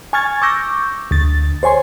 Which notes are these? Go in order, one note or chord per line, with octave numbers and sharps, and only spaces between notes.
G#5 C#6 F6 G#6 A6
C#6 D6 E6 G6 A#6
D2 A6
C5 C#5 G#5 C6